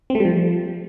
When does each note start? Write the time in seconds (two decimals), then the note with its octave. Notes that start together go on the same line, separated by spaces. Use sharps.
0.10 C4
0.15 A3
0.20 G3
0.25 F3